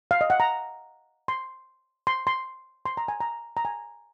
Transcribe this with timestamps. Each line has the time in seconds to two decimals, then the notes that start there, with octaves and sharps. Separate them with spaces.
0.11 F5
0.21 D#5
0.30 F#5
0.40 A#5
1.28 C6
2.07 C6
2.27 C6
2.86 C6
2.97 A#5
3.08 G#5
3.20 A#5
3.57 A#5
3.65 G#5